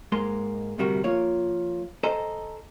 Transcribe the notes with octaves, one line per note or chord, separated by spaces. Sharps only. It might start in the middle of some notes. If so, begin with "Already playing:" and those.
G#2 G#3 A#3 C6
D2 G2 C3 G3 F#4 A#4
F3 A#3 F4 C#5
A4 C5 D#5 G#5 A#5